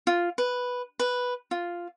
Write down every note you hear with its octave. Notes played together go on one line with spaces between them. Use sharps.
F4
B4
B4
F4